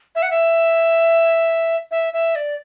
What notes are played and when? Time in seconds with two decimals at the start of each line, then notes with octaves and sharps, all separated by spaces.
0.15 E5
0.22 F#5
0.30 E5
1.91 E5
2.13 E5
2.35 D5